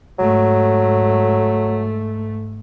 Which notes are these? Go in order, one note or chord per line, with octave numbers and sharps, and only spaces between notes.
G#2 F#3 A3